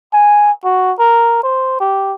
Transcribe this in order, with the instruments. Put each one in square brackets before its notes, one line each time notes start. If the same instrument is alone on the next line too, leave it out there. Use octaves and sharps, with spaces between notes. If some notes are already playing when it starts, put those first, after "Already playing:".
[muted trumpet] G#5
F#4
A#4
C5
G4